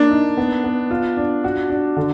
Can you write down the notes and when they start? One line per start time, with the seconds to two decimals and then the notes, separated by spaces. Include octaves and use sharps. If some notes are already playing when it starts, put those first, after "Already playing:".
Already playing: A#3 D4
0.11 D#4
0.37 B3
0.64 B3
0.91 F4
1.17 D4
1.44 F#4
1.70 D4
1.97 D3